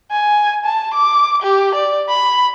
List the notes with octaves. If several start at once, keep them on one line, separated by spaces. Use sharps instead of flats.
G#5
A5
D6
G4
D5
B5